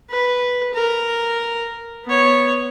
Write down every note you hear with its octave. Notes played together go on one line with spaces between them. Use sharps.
B4
A#4
B3 C#5